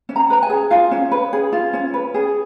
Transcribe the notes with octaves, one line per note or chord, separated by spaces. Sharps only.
C#4
A#5
B4 A#5
G#5
G#4
F4 F5
C#4
B4
G#4
F4
C#4
B4
G#4